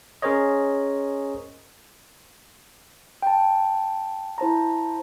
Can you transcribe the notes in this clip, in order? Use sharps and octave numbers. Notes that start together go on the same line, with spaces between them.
C#4 G#4 A#4 C5 C#5 D#5
G5 A5
E4 C5 A5 A#5